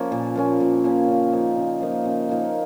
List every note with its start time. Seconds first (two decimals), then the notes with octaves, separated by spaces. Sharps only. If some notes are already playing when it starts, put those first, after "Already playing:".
Already playing: F3 A#3 C#4
0.12 A#2
0.35 F3 A#3 C#4
0.60 A#2
0.84 F3 A#3 C#4
1.08 C#3
1.33 F3 A#3 D#4
1.57 C#3
1.81 F3 A#3 D#4
2.05 C#3
2.29 F3 A#3 D#4